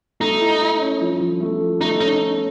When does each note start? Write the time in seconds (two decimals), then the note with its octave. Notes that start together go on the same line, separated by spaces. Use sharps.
0.20 A3 D#4
0.40 E4
0.61 E4
0.81 C#4
1.01 F3
1.20 F3
1.41 A3
1.61 F3
1.81 A3 D#4
2.01 C#4 D#4
2.21 C#4